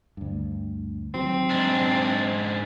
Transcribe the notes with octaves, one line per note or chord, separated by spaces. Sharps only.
D2 G2
D#3 F#3 C4
G#2 D4